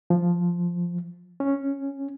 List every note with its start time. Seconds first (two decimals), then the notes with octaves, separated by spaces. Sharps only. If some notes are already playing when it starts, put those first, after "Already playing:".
0.10 F3
1.40 C#4